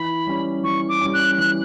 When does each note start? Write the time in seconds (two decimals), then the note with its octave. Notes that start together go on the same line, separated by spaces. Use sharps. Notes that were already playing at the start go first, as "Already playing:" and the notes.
Already playing: E3 B5
0.27 G3 C#4
0.64 E3 C#6
0.89 D6
1.01 G3 C#4
1.14 F#6
1.38 E3 F#6